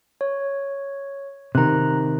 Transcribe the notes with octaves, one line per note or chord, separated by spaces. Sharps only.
C#5
C3 D#3 A#5 F#6